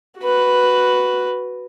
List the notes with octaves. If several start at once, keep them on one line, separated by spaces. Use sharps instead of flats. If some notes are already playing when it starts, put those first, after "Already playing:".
F#4 B4